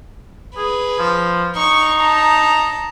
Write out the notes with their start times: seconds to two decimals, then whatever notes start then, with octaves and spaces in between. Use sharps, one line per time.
0.57 G#4 B4
0.99 F3
1.56 D#4 C#6
2.00 A5 A#5